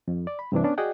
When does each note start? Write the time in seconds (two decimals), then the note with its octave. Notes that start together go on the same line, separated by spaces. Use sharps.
0.08 F2
0.27 D5
0.39 B5
0.52 G2 C3 E3 D4
0.64 B3 C#4 D4
0.78 F#4 G#4 D5 D#5 F#5 G5